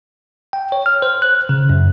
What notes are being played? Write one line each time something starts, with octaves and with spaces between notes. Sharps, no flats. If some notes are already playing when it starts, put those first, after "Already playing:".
G5
C#5
F6
C5
F#6
C#3
F#2